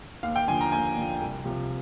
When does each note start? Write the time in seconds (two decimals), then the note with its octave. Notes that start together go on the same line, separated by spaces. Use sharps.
0.23 D#2 F5
0.36 G5
0.48 D3 F3 G#5
0.61 A#5
0.72 D#2 G#5
0.97 D3 F3
1.21 C2
1.45 C3 F3